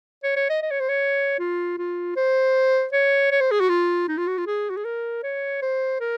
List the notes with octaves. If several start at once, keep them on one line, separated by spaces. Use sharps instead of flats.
C#5
C#5
D#5
D#5
C#5
C5
C#5
F4
F4
C5
C#5
C#5
C5
G#4
F#4
F4
D#4
F4
F#4
F4
G#4
F#4
G#4
A#4
C#5
C5
A#4